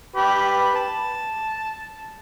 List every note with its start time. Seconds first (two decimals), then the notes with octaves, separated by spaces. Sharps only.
0.16 G4 B4
0.76 A5